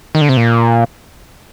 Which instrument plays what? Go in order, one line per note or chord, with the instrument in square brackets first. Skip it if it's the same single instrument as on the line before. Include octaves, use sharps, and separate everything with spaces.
[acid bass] D#3
D3
C3
A#2